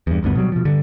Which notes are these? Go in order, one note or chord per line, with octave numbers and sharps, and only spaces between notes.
E2 G2
F#1 D2 G2 B3
B2 F#3 G3
B2 F3
G2 D3